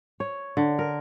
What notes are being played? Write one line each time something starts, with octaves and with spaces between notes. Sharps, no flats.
C#5
D3
A#4